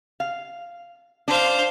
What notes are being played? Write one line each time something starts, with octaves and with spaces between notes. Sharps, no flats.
F5
D4 C5 F5